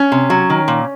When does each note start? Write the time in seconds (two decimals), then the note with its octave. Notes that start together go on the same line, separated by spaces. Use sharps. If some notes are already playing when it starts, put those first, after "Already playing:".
Already playing: C#4
0.12 C3
0.30 F#3
0.50 D#3
0.68 A#2